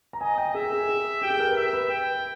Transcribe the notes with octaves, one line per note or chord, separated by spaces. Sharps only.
A#5
D#5 G#5
G5
G#4 E5
G#4
G#4
G4 G5
G#4
A#4
B4
E5
B4
G5